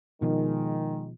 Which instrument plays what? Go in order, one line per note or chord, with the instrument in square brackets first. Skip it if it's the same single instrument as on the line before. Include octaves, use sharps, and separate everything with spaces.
[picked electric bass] B2 F3 [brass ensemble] D#3 G#3